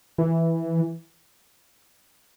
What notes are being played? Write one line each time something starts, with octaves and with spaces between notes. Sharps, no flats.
E3